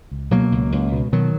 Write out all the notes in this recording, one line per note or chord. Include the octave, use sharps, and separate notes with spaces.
C#2
B2 F#3 A#3
C#2
C#2
B2
B2 D#3 F#3